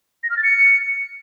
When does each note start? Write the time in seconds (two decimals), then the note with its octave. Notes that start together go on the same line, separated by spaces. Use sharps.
0.23 A#6
0.30 F6
0.37 A6
0.44 C#7